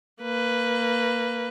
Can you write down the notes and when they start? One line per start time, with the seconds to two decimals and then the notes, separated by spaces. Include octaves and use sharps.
0.23 A#3 B4